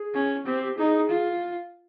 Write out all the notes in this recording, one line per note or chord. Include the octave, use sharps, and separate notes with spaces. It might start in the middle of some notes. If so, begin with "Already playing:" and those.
Already playing: G#4
C#4
C4 G4
G4
D#4 G#4
F4